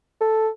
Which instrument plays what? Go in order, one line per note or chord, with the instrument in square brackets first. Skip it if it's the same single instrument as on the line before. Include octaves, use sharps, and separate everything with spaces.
[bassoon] A4